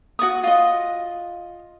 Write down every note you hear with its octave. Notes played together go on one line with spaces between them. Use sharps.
F#4 D5 C#6 D#6
F4 D#5